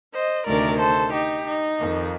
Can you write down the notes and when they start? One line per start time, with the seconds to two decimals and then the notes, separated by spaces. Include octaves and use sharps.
0.14 C5 D#5
0.46 D2 C3 D#3 A#4 D5
0.79 A4 C5
1.12 D#4 G4
1.45 D#4
1.78 F2 D#3